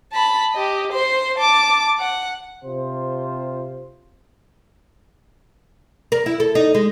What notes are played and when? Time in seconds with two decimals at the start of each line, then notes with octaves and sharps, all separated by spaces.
0.13 A5 B5
0.53 G4 D#5
0.92 C5 C6
1.38 A5 D6
2.00 F#5
2.63 C3 F4 C5
6.12 A#4
6.26 E4
6.40 A4
6.55 D#4
6.75 G#3